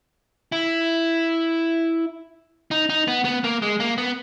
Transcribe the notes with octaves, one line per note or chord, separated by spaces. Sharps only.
E4
D#4
D#4
B3
B3
A#3
G#3
A#3
B3